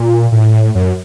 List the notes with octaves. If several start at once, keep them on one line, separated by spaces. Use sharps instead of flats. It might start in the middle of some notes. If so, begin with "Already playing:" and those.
Already playing: A#2
A2
F#2